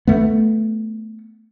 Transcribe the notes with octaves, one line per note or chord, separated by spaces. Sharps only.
A3 B3